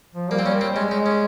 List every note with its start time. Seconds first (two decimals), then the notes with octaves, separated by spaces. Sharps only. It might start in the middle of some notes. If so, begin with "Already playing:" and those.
0.16 F3
0.30 G3 A#3
0.39 C4
0.46 G3 C#4
0.61 C4
0.76 G#3 C#4
0.91 D#4
1.06 C#4